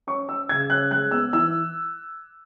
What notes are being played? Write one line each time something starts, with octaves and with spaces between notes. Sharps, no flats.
C#4 C#6
C#4 E6
C#3 G#6
C#4 F#6
G#3 F#6
B3 E6
E3 E6